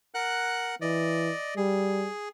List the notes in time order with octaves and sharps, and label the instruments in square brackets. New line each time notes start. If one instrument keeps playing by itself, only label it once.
[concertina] A#4 F#5 F#6
[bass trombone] E3 [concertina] D5 D#5
[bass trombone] G3 [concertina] G#4